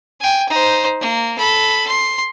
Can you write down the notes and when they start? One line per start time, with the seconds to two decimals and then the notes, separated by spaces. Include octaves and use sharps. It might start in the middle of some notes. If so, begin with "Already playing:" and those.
0.20 G5 G#5
0.49 D#4 C5
1.00 A#3
1.39 A4 B5
1.88 C6